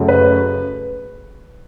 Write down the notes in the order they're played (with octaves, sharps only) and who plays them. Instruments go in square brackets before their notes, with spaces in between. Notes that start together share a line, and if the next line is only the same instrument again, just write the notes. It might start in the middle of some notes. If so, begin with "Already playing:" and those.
Already playing: [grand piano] F#2 C#3 F#3 A3
B4